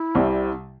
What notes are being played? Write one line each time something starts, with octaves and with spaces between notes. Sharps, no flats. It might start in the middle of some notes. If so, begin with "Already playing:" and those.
Already playing: E4
C2 C3 G3 C4